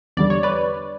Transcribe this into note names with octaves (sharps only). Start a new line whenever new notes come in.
E2 D3 G3 D5
C#5
B4 D5